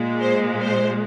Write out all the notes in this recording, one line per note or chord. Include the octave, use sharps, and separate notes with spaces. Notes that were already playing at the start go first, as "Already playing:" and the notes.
Already playing: A#2 G#3
C5
C5